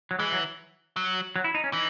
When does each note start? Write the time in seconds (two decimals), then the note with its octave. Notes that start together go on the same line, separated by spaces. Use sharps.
0.11 F#3
0.19 E3 G#3
0.32 F#3
0.96 F#3
1.36 F#3
1.44 E4
1.55 D#4
1.64 C#4
1.73 E3 D#4